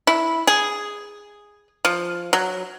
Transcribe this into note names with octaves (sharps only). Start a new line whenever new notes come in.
E4
G#4
F3
F#3